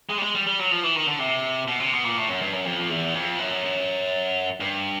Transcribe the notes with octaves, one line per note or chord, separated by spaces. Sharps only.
G#3
G3
G#3
G3
G3
F#3
F3
E3
D#3
D3
C3
B2
C3
B2
A#2
A2
F#2
G2
F#2
F2
E2
F2
F#2
G2